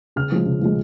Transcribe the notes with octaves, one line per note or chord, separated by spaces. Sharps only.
C#3 F6
F3 G#3
C#3
F3 G#3